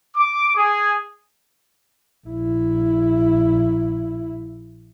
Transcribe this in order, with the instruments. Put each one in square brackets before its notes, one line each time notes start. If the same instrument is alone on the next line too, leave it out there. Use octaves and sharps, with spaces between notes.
[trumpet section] D6
G#4
[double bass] A#1 E4